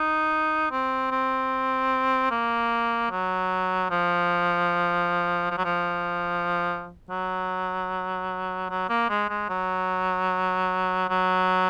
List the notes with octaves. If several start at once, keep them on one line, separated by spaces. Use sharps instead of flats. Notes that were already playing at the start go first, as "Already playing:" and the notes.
Already playing: D#4
C4
C4
A#3
F#3
F3
F3
F#3
F3
F#3
F#3
A#3
G#3
G#3
F#3
F#3